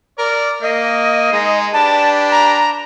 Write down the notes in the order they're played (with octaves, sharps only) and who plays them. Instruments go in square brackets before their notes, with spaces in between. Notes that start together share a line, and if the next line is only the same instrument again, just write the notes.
[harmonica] A#4 D5
[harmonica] A#3 [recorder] D#5
[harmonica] G#3 D#4
[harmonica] D4 G4 B4 [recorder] A5
[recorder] A#5